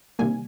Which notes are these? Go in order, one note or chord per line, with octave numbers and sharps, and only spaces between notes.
C3 D#3 G3 A#3 G#5